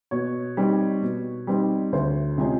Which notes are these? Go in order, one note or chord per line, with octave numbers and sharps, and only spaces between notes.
B2 C#5
G3 C4 D#4
B2
G3 C4 D#4
D2 C5
C3 F3 G#3 C#4